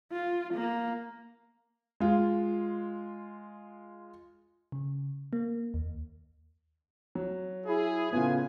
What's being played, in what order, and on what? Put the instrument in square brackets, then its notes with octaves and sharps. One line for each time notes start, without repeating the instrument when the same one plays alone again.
[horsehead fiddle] F4
A#3
[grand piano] G#3 F4
[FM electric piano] C#3
A#3
D#2
[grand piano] F#3
[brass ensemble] E4 G#4
[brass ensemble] A2 F4 G#5 [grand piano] C#3 B3